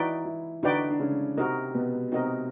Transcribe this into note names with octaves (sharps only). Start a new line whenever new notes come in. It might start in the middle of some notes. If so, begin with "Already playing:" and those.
Already playing: E3 D#4 E4 F#4 B4 D5 G5
E3 E4
D3 D4 D#4 F#4 B4 D5 G5
D4
C#3 C#4
C3 C4 D#4 F#4 A#4 D#5
B2 B3
C3 C4 D#4 F#4 A#4 D#5